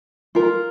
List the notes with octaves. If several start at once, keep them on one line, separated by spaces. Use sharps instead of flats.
F4 A#4